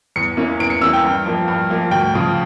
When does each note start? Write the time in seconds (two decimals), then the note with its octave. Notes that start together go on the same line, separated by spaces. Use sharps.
0.16 E2 C#7
0.37 E3 A#3 C#4
0.59 E2 D7
0.70 C#7
0.81 E3 A#3 C#4 E6
0.93 G5
1.03 G2
1.26 F3 A#3
1.48 G2
1.70 F3 A#3
1.91 D2 G5
2.14 C#3 F3